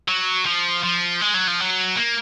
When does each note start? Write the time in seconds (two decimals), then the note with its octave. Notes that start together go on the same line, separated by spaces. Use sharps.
0.08 F#3
0.46 F3
0.84 F3
1.21 G#3
1.34 F#3
1.47 F3
1.60 F#3
1.96 A#3